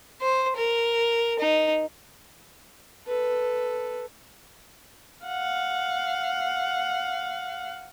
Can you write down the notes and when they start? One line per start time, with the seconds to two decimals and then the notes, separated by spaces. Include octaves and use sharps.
0.21 C5
0.57 A#4
1.39 D#4
3.07 A4 B4
5.26 F5 F#5